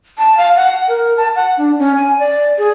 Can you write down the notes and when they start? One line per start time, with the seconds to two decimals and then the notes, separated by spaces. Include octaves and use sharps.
0.19 A5
0.37 F5
0.56 F#5
0.88 A#4
1.17 A5
1.36 F#5
1.58 D4
1.79 C#4
1.96 G#5
2.19 D5
2.58 G#4